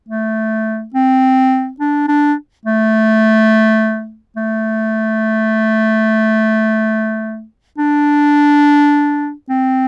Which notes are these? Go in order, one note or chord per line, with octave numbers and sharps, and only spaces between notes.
A3
C4
D4
D4
A3
A3
D4
C4